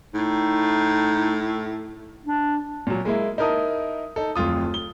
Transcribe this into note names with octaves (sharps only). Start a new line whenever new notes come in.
A2 D#4
D4
A#2 F#3
G#3 A#3 E4
D#4 E4 A#4 A5 D#6
D#4 A4
D1 F2 F4 D#6
G7